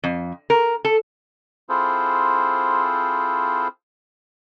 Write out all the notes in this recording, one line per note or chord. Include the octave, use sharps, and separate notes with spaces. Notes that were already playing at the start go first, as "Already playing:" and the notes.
F2
A#4
A4
C4 E4 F4 G#4 A4 C5